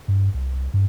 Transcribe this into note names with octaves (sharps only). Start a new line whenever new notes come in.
G2
C2
G2